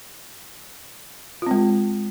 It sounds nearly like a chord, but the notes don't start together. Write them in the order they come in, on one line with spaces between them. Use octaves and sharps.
F4 C4 G#3